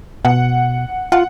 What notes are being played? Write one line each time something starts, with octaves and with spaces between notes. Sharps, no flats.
B2 F#5
F4 F#5